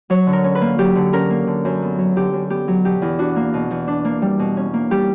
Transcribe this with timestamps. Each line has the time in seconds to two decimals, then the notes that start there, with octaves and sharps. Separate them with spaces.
0.10 F#3 C#5
0.27 D3
0.33 A#4
0.44 C#4
0.55 B4
0.61 A#3
0.79 F#3 G4
0.96 D3
1.13 C#4 A#4
1.30 A#3
1.47 D3
1.65 F#2
1.82 B3
1.98 F#3
2.16 D3 G4
2.33 F#2
2.50 B3 G4
2.68 F#3
2.84 B2 G4
3.02 E2
3.19 D4 F#4
3.36 A#3
3.54 B2
3.71 E2
3.87 D4
4.05 A#3
4.22 G3
4.39 B2
4.57 C#4
4.74 A#3
4.91 G3 G4